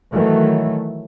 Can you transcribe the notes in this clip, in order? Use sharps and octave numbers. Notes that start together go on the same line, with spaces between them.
D#3 E3 F#3 A3